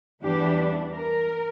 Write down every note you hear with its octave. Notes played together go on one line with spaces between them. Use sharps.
E2 E3 G3 D4 G4
A#4